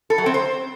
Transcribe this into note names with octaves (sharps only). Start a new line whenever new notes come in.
A4
F#3
C4
C5